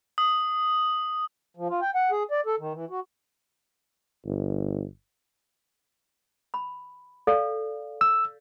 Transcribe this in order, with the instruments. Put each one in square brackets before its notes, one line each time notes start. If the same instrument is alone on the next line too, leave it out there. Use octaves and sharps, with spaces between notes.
[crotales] D#6
[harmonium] F3
F4
G5
F#5
G#4
D5
A4
D#3
E3
F#4
[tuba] G1
[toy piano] B5
A4 D5 F5
[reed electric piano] E6